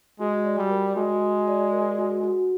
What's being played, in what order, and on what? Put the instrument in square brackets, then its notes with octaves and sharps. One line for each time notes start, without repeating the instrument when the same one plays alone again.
[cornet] G#3 [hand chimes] F#4
[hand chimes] D5
[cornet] G3
[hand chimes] A#4
[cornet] G#3 [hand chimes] F#4
[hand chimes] F#4
D5
A#4
F#4
F#4